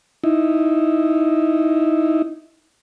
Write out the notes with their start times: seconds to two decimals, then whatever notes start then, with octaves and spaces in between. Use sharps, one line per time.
0.24 D#4 E4